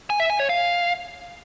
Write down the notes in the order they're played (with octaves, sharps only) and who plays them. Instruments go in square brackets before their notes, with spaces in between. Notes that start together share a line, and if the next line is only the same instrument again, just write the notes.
[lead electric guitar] G#5
E5
G#5
C#5
F5